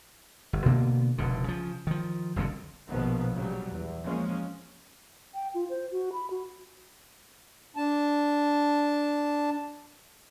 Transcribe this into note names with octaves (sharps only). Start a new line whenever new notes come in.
G1
B2 D3 A#3 B3
F1 C2 B2 D3
C#3 F3
D#3 F3
F#1 C2 F2 D3
A#1 B2 D#3 F3 B3
C#3 F#3 G3
E2
F3 G#3 A#3 C#4
G5
F4
C5
F#4
B5
F#4
D4 A5